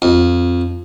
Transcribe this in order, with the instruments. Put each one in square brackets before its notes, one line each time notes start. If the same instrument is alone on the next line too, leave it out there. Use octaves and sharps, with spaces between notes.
[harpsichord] F2